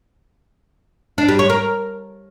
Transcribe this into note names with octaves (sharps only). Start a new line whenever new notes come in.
D4
G3
C#5
A#4